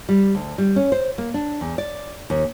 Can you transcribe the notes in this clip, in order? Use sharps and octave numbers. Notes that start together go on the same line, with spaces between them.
G3
D2
G3
C#4
C5
A#3
D4
E2
D5
D#2